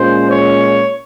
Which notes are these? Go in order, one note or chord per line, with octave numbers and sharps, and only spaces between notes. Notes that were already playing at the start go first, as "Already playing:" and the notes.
Already playing: A#2 G#3 C#4 F4 C5
C#5